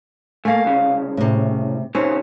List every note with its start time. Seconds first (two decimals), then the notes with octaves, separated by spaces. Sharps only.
0.45 A3 A#3 F5 G#5
0.65 C2 C#3
1.17 A2 C3
1.95 C3 D#3 C4 C#4